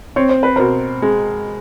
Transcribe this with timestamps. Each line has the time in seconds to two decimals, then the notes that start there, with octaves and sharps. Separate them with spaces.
0.16 C4 C#5
0.29 C5
0.43 B4
0.56 B2 A#4 C5
1.02 G#3